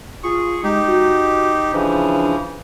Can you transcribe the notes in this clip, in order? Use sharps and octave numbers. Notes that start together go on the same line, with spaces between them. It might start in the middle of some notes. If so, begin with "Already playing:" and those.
F4 G#4 C#6
G#3 D#4 G4
F#4
C#3 E3 F3 D4